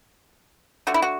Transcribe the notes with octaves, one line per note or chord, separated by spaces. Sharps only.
D3 A3 F#4
E4
F#4